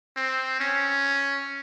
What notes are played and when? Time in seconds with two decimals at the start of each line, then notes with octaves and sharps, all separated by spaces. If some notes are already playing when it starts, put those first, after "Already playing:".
0.17 C4
0.60 C#4